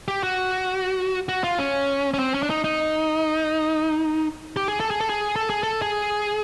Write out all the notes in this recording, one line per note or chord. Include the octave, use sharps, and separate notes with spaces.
G4
F#4
F#4
F4
C#4
C#4
C4
C#4
D4
D#4
D#4
G4
G#4
A4
G#4
A4
G#4
A4
G#4
A4
G#4